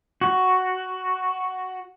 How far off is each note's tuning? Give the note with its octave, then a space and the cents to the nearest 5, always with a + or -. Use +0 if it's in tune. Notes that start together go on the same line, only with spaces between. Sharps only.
F#4 +5